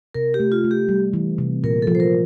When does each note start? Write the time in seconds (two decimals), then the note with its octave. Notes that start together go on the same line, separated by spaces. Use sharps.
0.14 C3 A#4
0.34 G4
0.40 A3
0.52 F4
0.64 A3
0.71 G4
0.89 G3
1.13 E3
1.38 C3
1.64 A#2 A#4
1.82 A4
1.87 F3
1.95 C5
2.00 A#4